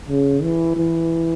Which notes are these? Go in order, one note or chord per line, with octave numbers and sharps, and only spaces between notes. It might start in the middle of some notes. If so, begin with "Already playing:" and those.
C#3
E3
E3